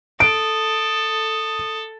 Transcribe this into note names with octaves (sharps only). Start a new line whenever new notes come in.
A4 D#6 D7